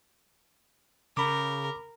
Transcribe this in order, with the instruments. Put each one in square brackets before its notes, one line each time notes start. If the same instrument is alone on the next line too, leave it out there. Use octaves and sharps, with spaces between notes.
[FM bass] C#3 [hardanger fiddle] A#4 [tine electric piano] B5 D6